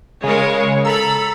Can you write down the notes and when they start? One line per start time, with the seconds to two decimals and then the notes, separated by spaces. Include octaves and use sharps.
0.23 C#3 G#3 A#4 C#5
0.85 A4 A#5 B5 E6